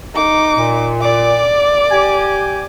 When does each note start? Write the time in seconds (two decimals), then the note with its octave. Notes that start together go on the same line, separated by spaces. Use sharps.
0.15 D#4 D6
0.57 A#2
1.01 D5 D6
1.91 G4 G#5